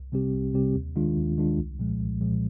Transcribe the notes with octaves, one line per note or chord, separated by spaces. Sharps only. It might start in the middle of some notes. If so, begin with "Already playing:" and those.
Already playing: C2
C3 G3 C4 G4
C2
C3 G3 C4 G4
D#2
D#3 G#3 D4 F4
D#2
D#3 G#3 D4 F4
C2
A#2 F3 G#3
C2
A#2 F3 G#3